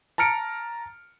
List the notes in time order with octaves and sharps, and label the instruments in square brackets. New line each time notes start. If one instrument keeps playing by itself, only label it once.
[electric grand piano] A5 A#5 F6 C#7 D7